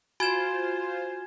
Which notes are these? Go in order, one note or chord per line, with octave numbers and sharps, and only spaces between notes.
F4 F#4 C5 G#5 G#6 E7